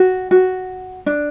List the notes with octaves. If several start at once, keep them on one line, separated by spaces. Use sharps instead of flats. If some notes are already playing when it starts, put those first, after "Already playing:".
Already playing: F#4
F#4
D4